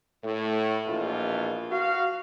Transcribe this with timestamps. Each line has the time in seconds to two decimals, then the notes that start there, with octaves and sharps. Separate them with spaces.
0.23 A2
0.87 A#1 E2 B2 F4
1.70 F#4 F5